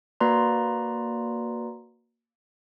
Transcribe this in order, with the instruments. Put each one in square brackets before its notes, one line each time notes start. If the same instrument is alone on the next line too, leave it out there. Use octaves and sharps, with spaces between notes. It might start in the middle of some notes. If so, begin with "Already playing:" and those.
[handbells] A#3 F#4 B4 D5 A#5 C6